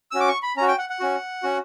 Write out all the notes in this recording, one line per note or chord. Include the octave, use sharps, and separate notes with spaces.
C#4 F#4 E6
D6
C#6
B5
C#4 F#4 A#5
G5
F#5
F#5
C#4 F#4
C#4 F#4